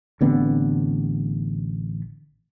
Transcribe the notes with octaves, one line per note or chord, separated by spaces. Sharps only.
A1 D3 B3 C4